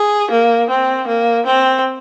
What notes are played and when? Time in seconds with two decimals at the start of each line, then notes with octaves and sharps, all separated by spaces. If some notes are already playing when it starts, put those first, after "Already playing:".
Already playing: G#4
0.31 A#3
0.69 C4
1.07 A#3
1.46 C4